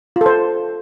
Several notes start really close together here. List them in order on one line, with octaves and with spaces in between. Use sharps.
F4 A4 C5